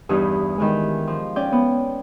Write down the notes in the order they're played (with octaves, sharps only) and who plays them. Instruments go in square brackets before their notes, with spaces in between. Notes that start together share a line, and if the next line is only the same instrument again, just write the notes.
[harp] E2 G2 E3 D#4
D#3 E3 G#3
F3
C#4 D5 G5
B3